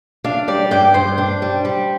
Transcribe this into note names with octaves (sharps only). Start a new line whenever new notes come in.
D4 F5
G3 D5
G2 G5
G2 C5
D4
G3
G3